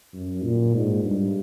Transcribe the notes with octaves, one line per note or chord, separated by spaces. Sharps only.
F#2
A#2
G#2
G2